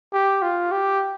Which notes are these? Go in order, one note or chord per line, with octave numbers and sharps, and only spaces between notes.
G4
F4
G4